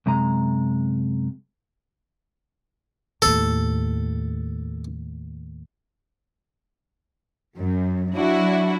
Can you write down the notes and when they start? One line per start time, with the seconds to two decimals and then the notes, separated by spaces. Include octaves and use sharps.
0.06 F#2 C3 G#3 A#5
3.22 D#2 A2 A4
7.58 F#2
8.13 F#3 D4 E4 F#4